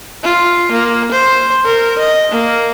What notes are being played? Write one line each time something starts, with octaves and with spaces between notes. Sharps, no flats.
F4
A#3
C5
A#4
D#5
A#3